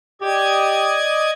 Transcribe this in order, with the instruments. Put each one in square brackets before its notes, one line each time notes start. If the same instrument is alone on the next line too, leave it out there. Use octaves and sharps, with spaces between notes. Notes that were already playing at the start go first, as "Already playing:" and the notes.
[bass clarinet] G4 [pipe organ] D5 D#5 G#6